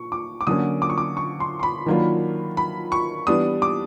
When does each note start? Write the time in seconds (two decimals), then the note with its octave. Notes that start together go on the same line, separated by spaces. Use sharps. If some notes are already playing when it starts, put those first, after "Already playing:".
Already playing: A#2 C#6
0.12 D6
0.41 D6
0.47 D3 F#3 A#3 C#4 D#6
0.82 D6
0.90 C#6
0.98 D6
1.17 C#6
1.40 C6
1.60 C6
1.63 B5
1.86 D#3 F#3 A#3 D4 F4
2.57 B5
2.92 C#6
3.27 E3 G3 B3 D4 D#6
3.62 D6